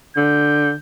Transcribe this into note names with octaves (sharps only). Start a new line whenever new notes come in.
D3 G6